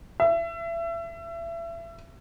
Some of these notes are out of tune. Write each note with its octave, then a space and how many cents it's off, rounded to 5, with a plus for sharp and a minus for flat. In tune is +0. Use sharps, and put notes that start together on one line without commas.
E5 +30